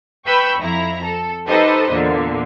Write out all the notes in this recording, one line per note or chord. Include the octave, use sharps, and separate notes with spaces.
B4 G5 B5 C#6 E6 G6
F2 E4 A#5
A4
D#4 G4 A4 B4 C5 D#5
E2 A#2 D3